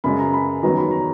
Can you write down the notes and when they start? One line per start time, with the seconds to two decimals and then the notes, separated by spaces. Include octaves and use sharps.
0.04 F#2 C#3 G#3 B5
0.19 A#5
0.33 B5
0.63 E2 D#3 F#3 A#5
0.77 B5
0.91 A#5